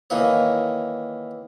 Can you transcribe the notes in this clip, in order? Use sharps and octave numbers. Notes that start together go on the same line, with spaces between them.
D#3 E3 A#3 C#5